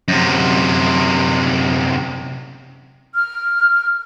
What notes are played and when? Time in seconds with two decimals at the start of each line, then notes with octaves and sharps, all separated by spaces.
0.08 F#2 C3
3.15 F6